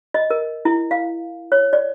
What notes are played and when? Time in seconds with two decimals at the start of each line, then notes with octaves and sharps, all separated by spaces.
0.14 D#5
0.30 A#4
0.65 E4
0.91 F5
1.52 C#5
1.73 D5